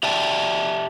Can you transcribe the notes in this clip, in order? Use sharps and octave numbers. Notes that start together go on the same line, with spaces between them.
G4 D5 E5 G5 A5